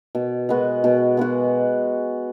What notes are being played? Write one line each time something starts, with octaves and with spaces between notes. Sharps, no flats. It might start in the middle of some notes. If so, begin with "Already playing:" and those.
B2
G#3 B3 F#4
B2
G#3 B3 F#4